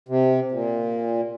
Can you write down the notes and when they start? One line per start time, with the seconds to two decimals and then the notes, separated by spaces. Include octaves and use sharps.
0.09 C3
0.51 A#2